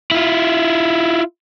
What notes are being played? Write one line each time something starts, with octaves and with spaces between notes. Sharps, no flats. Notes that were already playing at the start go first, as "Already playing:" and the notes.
E4 F4